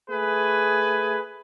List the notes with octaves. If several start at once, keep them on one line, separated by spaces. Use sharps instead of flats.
A3 G#4 B4 G#5